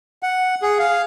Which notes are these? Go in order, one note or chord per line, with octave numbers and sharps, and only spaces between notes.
F#5
G#4
F5